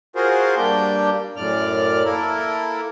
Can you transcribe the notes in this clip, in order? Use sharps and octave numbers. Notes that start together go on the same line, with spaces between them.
F4 F#4 G#4 A#4 C5
G2 A#3 D4 G4 G6
F#2 A2 D5 F6
A#3 E4 A4 A#4